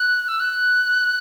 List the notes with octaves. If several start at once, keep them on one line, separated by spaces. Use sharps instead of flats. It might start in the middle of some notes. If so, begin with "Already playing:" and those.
Already playing: F#6
E6
F#6